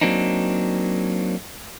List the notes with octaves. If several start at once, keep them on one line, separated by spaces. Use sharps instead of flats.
F#3 A#3 C4 D4 D#4